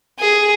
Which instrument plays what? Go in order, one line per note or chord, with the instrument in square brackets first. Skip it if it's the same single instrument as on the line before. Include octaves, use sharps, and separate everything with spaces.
[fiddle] G#4